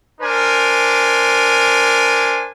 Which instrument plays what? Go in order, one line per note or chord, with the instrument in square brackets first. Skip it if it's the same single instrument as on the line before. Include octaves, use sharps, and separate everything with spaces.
[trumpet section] D4 A#4 C5 G#5